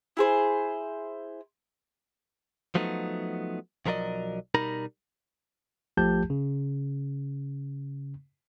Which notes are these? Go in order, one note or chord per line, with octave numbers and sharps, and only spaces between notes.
E4 G#4 C5
F3 F#3 A3 B3 D#4
B1 F3 F#3 A#4 D5 D#5
B2 G3 D#4 A#4 A#5 B5
A#1 F3 A3 G4 A5 G6
C#3